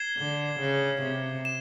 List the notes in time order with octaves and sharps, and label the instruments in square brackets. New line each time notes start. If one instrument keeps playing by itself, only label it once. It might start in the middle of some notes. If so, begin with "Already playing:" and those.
Already playing: [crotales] G#6 C7 E7 G7
[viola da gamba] D3
C#3
C3
[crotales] E7